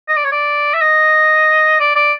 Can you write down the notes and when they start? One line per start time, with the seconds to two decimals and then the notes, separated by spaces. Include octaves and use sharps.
0.09 D#5
0.16 D5
0.24 C#5
0.32 D5
0.74 E5
0.81 D#5
1.80 D5
1.96 D5